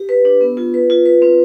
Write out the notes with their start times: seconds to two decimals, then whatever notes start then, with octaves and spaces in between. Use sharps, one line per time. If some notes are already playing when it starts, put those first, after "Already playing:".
Already playing: G4
0.09 B4
0.25 D4
0.41 B3
0.57 F4
0.74 B4
0.90 F4
1.06 B4
1.22 C4